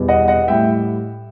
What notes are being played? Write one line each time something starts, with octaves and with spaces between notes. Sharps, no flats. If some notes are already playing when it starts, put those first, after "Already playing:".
Already playing: E2 B2 G3
D#5 F#5
D#5 F#5
A2 G3 E5 G5